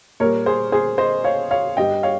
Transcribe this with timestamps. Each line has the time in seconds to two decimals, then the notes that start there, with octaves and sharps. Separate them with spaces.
0.20 A#2 G3 A#4 C#5
0.46 G#4 C5
0.72 G#4 C5
0.98 C5 D#5
1.24 C#5 F5
1.51 C#5 F5
1.77 G2 G3 D#5 G5
2.03 C#5 F5